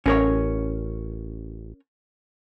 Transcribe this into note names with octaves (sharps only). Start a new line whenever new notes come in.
A1 C#4 A#4 C#5